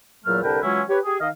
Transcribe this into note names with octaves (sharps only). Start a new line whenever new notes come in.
E2 A#2 F#3 A3 F6
C2 D3 A#4 B4 G5 A5
E3 F#3 G#3 C#4 E4 F4
G4 B4 C#5
G4 G#4
D#3 D#5 F5